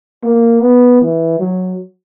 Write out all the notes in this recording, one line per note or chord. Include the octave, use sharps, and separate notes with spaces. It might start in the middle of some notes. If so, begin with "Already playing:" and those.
A#3
B3
E3
F#3